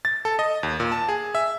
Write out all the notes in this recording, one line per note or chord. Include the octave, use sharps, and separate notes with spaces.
A6
A4
D#5
D#2
A#2
A5
G#4
E5